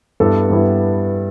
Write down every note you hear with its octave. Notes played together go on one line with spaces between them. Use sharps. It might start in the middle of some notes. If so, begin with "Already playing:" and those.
G2 G3 B3 E4 A4
G2 G3 B3 E4